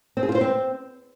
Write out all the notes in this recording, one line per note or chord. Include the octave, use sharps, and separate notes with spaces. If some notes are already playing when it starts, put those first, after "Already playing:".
C4
G#4
F4
C5
C4